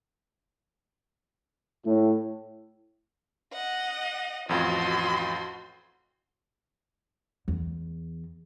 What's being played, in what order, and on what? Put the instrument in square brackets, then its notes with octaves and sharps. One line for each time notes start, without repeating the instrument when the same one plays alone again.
[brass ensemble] A2
[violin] D#5 F#5
[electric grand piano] A1 F2 F4 [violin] F#4 C6
[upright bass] E2